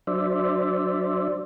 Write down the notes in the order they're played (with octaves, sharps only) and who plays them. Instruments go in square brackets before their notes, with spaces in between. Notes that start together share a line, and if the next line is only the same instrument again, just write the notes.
[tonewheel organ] F#3 D4 C5 D5 E5